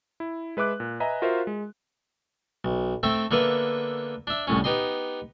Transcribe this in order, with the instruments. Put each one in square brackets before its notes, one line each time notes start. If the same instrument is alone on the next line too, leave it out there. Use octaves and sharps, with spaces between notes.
[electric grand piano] E4
G#3 B4 E5 D6 F#6
A#2
B4 D#5 E5 G#5 A#5
F4 F#4 A#4 C5 E5 F5
G#3
[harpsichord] B1
A3 C4 E5 G5
D3 A#3 B3 B4 E5
D4 E5
C2 A2 C#4
B3 D#4 G4 D#5 C6